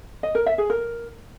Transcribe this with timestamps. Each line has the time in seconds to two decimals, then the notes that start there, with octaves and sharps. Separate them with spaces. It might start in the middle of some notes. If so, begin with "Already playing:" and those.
0.23 D#5
0.35 A#4
0.46 E5
0.58 G#4
0.70 A#4